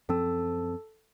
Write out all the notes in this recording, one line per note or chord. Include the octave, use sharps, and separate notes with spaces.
F#2 F3 C4 A4 A5 E6